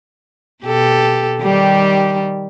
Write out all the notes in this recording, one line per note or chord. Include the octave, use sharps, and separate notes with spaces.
B2 G4 A4
D#3 G3 G4